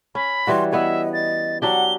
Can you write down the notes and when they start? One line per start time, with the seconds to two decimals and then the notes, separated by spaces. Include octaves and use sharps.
0.15 C#4 B5
0.47 E3 G3 F#4 C6
0.72 B3 B4 C#5 D#5 E5
1.14 D#5 A6
1.62 F#3 D4 G4 F#5 G7